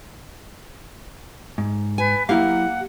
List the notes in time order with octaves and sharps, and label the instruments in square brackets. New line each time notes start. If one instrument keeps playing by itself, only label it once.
[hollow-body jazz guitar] G#2
[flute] B4 [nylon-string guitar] G#5
[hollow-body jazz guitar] F#3 E4 F5 [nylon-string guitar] A#3 G4 [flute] F#5